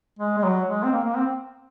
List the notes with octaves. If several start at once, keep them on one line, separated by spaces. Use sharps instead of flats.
G#3
G#3
F#3
G#3
C4
A#3
A#3
C4